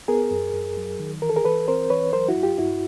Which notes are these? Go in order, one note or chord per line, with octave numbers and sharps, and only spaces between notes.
B3 G#4 A#4
F#2
F#2
F#3
D#3
E3 A#4
A4
G#4 A#4
E3 A4 B4
C4 A#4 C5
E3 B4 C#5
F#3 A#4 C5
E4 F#4
G2
F4 G4
G2 E4 F#4